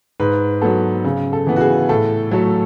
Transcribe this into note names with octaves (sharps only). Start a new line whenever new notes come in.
G#2 B4
F#3 B3 A4
C#3
A4
E3 B3
F#4
G#4
A2 A4
F#3 A3